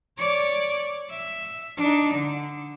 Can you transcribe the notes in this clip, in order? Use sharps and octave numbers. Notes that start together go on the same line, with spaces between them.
C#5 D5
E5
D4 D#4
D3